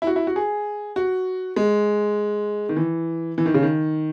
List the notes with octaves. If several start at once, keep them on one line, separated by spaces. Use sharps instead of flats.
E4
F#4
E4
F#4
G#4
F#4
G#3
D#3
E3
E3
D#3
C#3
D#3